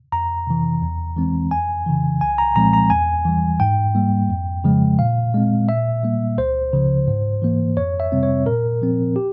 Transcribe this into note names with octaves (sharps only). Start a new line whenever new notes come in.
F2 A#5
C3 E3
E2
E3 G#3 C4
F2 G#5
C#3 E3
C2 G#5
A#5
A#2 F3 G#3 C4 A#5
A#5
E2 G#5
E3 G3
G#2 G5
G3 A#3
F2
C#3 F3 G#3
A#2 F5
G#3 C4
A#2 E5
G3 A#3
C#2 C5
C#3 F3
G#2
E3 A#3
F2 C#5
E5
C3 G3 C4
C#5
A#2 A#4
F3 C4
G4